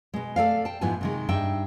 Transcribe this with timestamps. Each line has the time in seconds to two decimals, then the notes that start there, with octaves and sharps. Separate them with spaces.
0.14 B2 G#3
0.36 A3 A4 D5 F5
0.65 G5 A5
0.81 G#2 F3 B3 E4 G#5
1.01 C3 D#3 G#3
1.29 G2 D#4 E5 G5